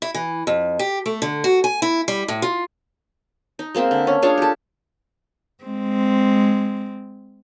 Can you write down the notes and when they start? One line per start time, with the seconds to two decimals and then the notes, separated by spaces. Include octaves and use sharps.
0.02 E4
0.14 E3
0.47 F2
0.79 G4
1.06 A3
1.22 D3
1.44 F#4
1.64 G#5
1.82 E4
2.08 G3
2.28 A2
2.42 F4
3.59 D#4
3.74 G#3 A#3 C4 E5
3.91 D3
4.07 C#4
4.22 D4 F4 G#4 C#5
4.38 G4 A4
5.64 G#3 C4